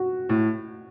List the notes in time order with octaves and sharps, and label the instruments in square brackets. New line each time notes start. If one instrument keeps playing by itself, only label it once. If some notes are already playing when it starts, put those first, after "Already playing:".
Already playing: [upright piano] F#4
[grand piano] A2